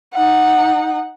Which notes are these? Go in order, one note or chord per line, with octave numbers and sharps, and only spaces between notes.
D#4 F#5